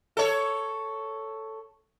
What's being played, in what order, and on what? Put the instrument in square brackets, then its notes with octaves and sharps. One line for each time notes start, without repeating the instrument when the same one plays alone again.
[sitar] A4 C#5